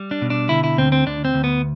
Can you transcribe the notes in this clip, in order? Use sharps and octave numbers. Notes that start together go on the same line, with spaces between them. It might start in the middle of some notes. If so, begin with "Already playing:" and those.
Already playing: G3
D4
B2
D4
D3 E4
E4
D2 C4
C4
D2 D4
C4
D2
B3